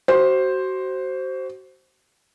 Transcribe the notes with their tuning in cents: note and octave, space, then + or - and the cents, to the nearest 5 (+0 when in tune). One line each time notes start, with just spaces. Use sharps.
F#4 +30 C5 +5